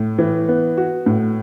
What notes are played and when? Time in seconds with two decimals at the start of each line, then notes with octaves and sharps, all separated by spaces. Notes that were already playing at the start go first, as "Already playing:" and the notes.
Already playing: A2
0.18 E3
0.48 B3
0.77 F#4
1.06 A2